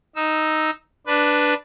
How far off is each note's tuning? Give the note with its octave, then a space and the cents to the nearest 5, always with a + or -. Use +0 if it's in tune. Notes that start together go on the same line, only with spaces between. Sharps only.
D#4 +0 E6 -15
D4 +0 B4 +0